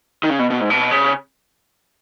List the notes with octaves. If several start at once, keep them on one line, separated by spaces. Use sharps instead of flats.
D#3
C#3
B2
B2
G#2
B2
C#3